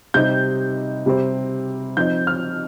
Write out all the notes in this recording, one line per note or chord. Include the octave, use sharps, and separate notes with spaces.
C3 G3 C4 D#4 G6
C3 G3 C4
F3 C4 D#4 G6
F6